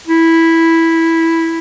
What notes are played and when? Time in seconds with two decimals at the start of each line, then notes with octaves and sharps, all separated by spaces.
0.07 E4